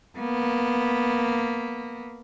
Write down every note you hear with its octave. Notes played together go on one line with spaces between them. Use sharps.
A#3 B3